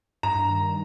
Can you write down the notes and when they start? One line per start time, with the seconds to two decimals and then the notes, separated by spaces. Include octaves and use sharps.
0.23 G2 A#5
0.48 D#3